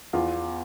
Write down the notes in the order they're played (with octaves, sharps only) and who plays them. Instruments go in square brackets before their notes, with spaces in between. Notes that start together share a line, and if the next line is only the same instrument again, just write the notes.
[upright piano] E2 F4